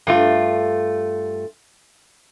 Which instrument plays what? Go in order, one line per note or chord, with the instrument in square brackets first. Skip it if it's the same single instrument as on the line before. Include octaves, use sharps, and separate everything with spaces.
[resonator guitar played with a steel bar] G2 A3 F4